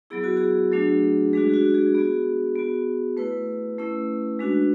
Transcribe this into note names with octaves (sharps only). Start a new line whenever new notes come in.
F#3 B3 E4 G#4
F#4
G#4
F#3 A3 D4 F#4
G#3 D4 F#4 G#4
G#4
F#4
G#4
B3 F#4 G#4
B3 F#4
A3 E4 B4
A3 C#4 E4
G#3 D4 F#4